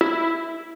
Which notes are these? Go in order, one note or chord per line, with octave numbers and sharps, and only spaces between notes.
E4